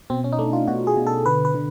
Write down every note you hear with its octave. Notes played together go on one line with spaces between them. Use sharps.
B2 C4
C#4
D#4
A3 D4
F4
B2 F#4
G#4
B2
A4
D3 B4
B4
D3